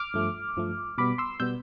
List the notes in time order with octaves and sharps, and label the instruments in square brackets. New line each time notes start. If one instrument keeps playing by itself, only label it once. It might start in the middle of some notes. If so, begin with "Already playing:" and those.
Already playing: [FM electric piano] D6 F6
G2 F3 A3
G2 F3 A3
B2 G3 B3 B5 D6
C6 E6
B2 G3 B3 E6 G6